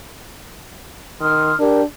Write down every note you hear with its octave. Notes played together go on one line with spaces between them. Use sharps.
D#3 C6 D#6 F6
D4 G4 A#4